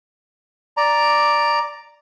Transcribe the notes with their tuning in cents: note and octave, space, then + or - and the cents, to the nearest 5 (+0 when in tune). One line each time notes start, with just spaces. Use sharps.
D5 +0 A#5 +0